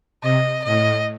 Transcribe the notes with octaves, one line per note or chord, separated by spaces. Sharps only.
C3 D#5
A2 D#5